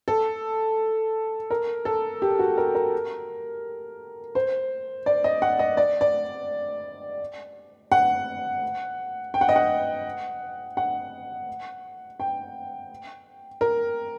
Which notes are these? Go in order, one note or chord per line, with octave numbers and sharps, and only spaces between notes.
A4
A#4
A4
G4
F#4
A#4
A#4
C5
D5
D#5
F#5
D#5
D5
D5
F#5
G5
F#5
D#5
F#5
F#5
G5
A#4